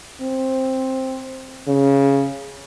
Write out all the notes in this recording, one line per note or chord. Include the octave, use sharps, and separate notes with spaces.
C4
C#3